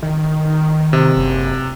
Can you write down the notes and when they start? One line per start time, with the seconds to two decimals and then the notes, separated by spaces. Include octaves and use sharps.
0.03 D#3
0.93 C3
1.17 F#1